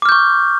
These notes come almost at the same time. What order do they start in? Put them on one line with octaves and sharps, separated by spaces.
D6 F6 G6 C#6